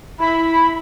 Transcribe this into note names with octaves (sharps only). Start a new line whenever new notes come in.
E4 B5